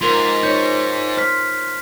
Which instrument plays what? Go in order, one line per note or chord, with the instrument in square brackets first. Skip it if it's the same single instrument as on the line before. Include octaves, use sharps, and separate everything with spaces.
[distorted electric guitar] G#2 [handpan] F4 A#4 [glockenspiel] C6 F7
[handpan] D#4 C#5 [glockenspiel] G6 C#7
[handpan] C5 [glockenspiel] F6 B6